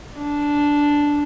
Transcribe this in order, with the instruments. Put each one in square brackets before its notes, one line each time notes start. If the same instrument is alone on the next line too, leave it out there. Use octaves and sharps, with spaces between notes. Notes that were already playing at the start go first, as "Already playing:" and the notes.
[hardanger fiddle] D4